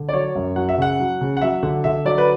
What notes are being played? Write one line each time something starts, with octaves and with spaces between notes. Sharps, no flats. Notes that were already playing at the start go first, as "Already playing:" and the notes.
Already playing: D3
D5
F#3 C#5
F#2
F#3 F#5
E5
C#3 F#5
F#3
C#3
F#5
F#3 E5
D3 F#5
D3 E5
F#3 D5
B4